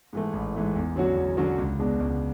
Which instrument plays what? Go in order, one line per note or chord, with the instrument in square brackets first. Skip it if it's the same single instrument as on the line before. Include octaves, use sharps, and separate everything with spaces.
[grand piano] G#2 E3 A3
A1
G#2 E3 A3
E2
D3 F#3 C#4 F#4
E2
D3 F#3 C#4 F#4
C#2
B2 G#3 D4
C#2